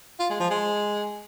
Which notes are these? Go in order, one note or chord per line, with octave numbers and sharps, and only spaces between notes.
F4
G#3
F3
G#3